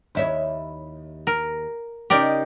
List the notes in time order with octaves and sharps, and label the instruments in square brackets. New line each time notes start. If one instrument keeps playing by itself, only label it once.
[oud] D#2 E4 C#5
[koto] A#4
[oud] C#3 D#4 [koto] G4 A#4 D5